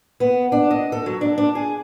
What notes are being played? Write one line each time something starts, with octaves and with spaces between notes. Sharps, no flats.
B3
D4
D#5
A4
F#3
D4
D4
G#4